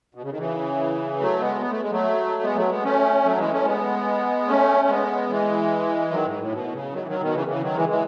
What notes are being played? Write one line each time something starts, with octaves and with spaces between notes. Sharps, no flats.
B2
C#3
D#3
C#3 E3
F#3 A3
G#3 B3
B3
A3
G#3
F#3 A3
G#3 B3
F#3 A3
G#3 B3
A3 C#4
F#3 A3
E3 G#3
A3 C#4
G#3 B3
A3 C#4
G#3 B3
E3 G#3
D#3 F#3
G#2
A2
B2
C#3
D#3 F#3
E3
D#3 F#3
B2 D#3
C#3 E3
C#3 E3
D#3 F#3
E3 G#3
E3 G#3